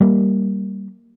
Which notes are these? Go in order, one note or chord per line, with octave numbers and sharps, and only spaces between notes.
G3 A#3